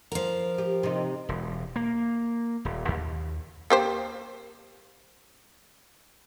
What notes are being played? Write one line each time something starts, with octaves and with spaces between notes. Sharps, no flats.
F3 A#4
G4
C3 D#4
E1
A#3
D#1
D#2
A#3 G4 C5